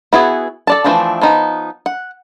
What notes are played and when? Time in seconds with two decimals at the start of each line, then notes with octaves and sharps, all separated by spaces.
0.13 B3 E4 F#4 G#4
0.67 A4 D5 A5
0.84 E3 F3 A3 C4 D4
1.22 F3 B3 D#4
1.86 F#5